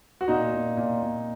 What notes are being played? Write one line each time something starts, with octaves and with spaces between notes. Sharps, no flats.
F#4
A#2 D#4
A#2
A#2
A#2